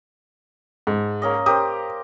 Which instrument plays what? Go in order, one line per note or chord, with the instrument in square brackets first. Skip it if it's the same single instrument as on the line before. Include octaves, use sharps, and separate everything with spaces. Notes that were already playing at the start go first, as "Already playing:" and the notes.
[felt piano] G#2 [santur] A5
[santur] A#3 C#4 D#5
[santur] G4 A#4 C5 [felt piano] D#6